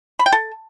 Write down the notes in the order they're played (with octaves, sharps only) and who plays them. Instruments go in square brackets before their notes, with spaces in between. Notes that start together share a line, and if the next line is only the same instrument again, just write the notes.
[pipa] B5
G5
A4